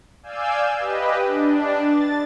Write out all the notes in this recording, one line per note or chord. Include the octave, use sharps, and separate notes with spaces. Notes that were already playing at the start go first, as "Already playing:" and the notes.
D5 F5 G#5 E6 G6
G4 B4 D#5
D4
A6